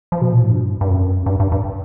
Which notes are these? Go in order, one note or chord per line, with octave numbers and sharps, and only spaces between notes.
F3
B2
A#2
A2
G2
G2
F#2
G2
G2
G2